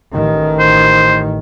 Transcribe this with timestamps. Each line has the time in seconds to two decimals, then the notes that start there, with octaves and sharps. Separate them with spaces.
0.14 A1 D#3
0.60 C5